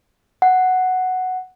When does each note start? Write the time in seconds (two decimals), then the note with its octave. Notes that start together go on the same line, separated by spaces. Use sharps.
0.42 F#5